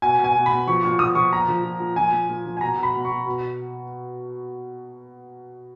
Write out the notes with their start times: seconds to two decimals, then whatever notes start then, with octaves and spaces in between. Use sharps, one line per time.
0.02 B2 G#5
0.19 B2
0.24 G#5
0.36 B2
0.46 B5
0.51 B2
0.67 F3 C#6
0.83 A#2 C#6
0.99 F3 D#6
1.15 F3 C#6
1.32 A#2 A#5
1.48 F3
1.64 A#2
1.80 A#2
1.96 F3 G#5
2.12 A#2
2.29 A#2
2.46 F3
2.57 G#5
2.61 B2 A#5
2.78 B2
2.83 B5
2.94 B2
3.05 C#6
3.10 B2
3.26 B2